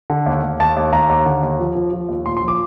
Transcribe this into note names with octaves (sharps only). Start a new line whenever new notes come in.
D3
D#2
D#2
D#2 A5
D#2
D#2 A#5
D#2
D3
D#2
F3
F3
F3
D#2
A#2 C6
C6
F3
D6